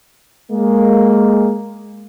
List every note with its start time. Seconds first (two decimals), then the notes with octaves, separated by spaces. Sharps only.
0.51 G#3 A#3